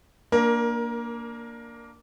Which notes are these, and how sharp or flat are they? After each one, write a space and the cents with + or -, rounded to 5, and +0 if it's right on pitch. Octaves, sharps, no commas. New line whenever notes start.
A#3 +0 D4 +0 A#4 +20